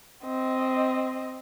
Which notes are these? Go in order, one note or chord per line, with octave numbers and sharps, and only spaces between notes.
C4 D#5